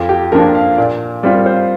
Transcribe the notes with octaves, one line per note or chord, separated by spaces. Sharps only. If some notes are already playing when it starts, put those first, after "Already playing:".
Already playing: F2 F4
G4
F3 A#3 D4 F4 A#4
F5
A#2 D5
G3 C4 F4 D5
A#4
C5